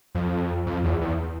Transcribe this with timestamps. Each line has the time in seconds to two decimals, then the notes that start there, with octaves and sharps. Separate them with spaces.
0.15 F2
0.66 F2
0.84 E2
1.01 E2